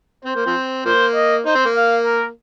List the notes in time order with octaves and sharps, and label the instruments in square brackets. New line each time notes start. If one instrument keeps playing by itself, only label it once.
[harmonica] C4 [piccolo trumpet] C5
[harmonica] A#3
F3 C4
[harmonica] F3 A#3 [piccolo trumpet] C5
[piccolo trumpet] D#5
[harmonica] D#4 [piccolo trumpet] C5
[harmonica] C4
A#3
[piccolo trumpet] F5
A#4